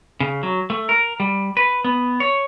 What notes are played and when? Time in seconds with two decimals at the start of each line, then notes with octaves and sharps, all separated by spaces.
0.20 C#3
0.43 F#3
0.70 A3
0.89 A#4
1.20 G3
1.57 B4
1.84 B3
2.20 C#5